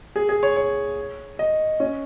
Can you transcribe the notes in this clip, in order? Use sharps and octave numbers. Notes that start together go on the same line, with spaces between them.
G#4
G#4
C#5
C#5
D#5
C#4